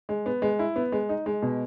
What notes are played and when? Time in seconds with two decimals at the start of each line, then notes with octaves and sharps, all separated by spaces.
0.09 G#3
0.26 B3
0.42 G#3
0.59 E4
0.76 B3
0.92 G#3
1.09 D#4
1.26 G#3
1.43 B2